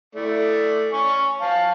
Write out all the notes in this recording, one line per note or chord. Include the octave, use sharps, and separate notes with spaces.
A3 E4 D5
C#4 G#5 C#6
F5 A5